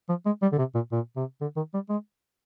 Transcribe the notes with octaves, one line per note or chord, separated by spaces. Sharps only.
F3
G#3
G3
D3
C3
A#2
A#2
C3
D3
D#3
G3
G#3